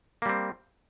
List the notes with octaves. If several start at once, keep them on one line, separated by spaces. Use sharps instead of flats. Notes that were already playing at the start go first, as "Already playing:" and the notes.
G3 A#3 C4